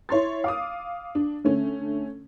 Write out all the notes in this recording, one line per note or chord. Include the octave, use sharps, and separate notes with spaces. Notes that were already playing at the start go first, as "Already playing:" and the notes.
E4 C#5 C6 A6
F5 D6 D#6
D4
D3 A3 C#4